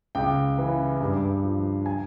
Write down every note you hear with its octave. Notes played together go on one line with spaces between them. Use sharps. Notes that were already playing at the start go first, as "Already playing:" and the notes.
C#2 G5
C#3 E3
G2
F3
G#5